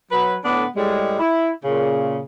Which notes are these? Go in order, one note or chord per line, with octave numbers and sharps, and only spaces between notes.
F#3 B4
A2 D3 B3 D4
A2 G3 G#3
E4
A#2 C#3